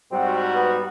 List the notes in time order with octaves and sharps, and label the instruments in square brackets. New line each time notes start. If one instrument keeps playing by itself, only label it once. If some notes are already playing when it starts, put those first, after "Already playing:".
[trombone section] G#2 G3 F#4 [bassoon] C4
[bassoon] B3